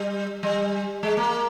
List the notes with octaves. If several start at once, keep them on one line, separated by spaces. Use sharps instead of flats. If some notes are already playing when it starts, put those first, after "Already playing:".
Already playing: G3
G3
G#3
A#3